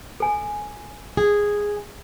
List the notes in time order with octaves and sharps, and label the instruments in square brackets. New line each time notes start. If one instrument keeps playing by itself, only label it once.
[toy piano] A4 G#5
[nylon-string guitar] G#4